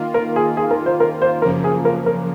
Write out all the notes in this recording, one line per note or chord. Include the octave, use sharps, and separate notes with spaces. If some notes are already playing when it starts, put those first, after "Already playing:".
Already playing: D#3 A#3 F4
A#4
G#4
G#4
A#4
C5
A#4
C5
F#2 C#3 F3 A#3 A#4
G#4
A#4
A#4